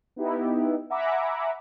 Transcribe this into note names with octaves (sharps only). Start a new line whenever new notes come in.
B3 D#4 E4 G4
E5 F#5 G#5 A#5 B5 D6